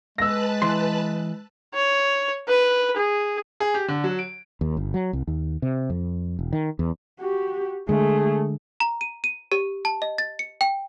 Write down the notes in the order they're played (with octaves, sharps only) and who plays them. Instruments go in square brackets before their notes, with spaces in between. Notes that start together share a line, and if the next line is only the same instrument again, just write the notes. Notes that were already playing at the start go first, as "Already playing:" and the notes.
[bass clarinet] G#3 [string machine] B4 A5 F#6 [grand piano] E6 A#6
[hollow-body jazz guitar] E3 C6
[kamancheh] C#5
B4
G#4
[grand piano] G#4
G4
D3
F#3
D7
[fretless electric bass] D#2
G1
F#3
C2
D#2
C3
F2
E1
D#3
E2
[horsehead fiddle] F#4 G4
[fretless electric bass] D3 G#3 [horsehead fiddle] A3 G#4
[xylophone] A#5
D#7
D#7
G4
A5
D#5
A6
C#7
G5